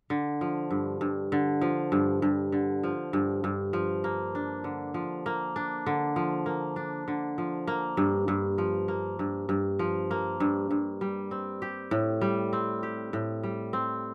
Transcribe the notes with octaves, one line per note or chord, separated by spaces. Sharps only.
D3
F3
G2
G2
D3
F3
G2
G2
D3
F3
G2
G2
F3
A#3
D4
D3
F3
A#3
D4
D3
F3
A#3
D4
D3
F3
A#3
G2
G2
F3
A#3
G2
G2
F3
A#3
G2
G2
G3
C4
G4
A2
G3
C4
G4
A2
G3
C4